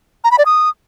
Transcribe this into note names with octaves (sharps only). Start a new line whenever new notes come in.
A#5
B5
D5
D#6